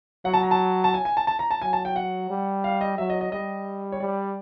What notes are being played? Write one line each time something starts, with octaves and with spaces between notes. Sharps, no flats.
F#3 F#5
A5
A#5
A5
A5
G#5
G#5
A5
A5
A#5
A5
F#3 G#5
A5
G5
F#5
G3
F5
D#5
F#3 E5
D#5
D#5
G3 D#5
C#5
G3 D5